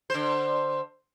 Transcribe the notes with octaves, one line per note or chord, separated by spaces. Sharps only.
D3 C5